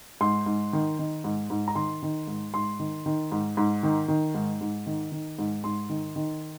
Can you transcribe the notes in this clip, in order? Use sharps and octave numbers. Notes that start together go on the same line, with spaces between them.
G#2 C6
G#2
D#3
D#3
G#2
G#2
A#5
D#3 C6
D#3
G#2
G#2 C6
D#3
D#3
G#2
G#2
D#3
D#3
G#2
G#2
D#3
D#3
G#2
G#2 C6
D#3
D#3